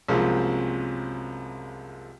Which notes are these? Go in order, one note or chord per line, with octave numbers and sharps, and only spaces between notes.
C2 F#2 F3 G#3 A#3 C4